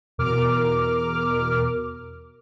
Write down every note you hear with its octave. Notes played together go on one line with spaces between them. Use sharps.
E2 B2 A#4 D6 F6